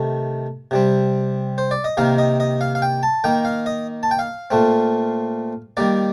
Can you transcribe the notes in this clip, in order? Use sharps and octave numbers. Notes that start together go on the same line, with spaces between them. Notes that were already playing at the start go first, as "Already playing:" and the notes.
Already playing: C3 D#3 A3
C3 G3 C4
C5
D5
D#5
C3 D#3 A#3 F5
D#5
D#5
F5
F5
G5
A5
D#3 A#3 G5
F5
D#5
A5
G5
F5
A#2 A3 C4
D#3 G3 A#3 D5